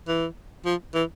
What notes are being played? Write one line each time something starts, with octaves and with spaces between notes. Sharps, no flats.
E3
F3
E3